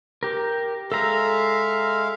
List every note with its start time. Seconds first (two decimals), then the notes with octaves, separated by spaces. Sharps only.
0.23 G4 A#4
0.92 G#3 A4 E5 F5 A#5